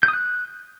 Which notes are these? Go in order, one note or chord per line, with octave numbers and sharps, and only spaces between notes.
G6
D#6
F#6